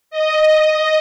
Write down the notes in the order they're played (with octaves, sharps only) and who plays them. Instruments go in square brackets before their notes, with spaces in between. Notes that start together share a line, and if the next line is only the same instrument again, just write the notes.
[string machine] D#5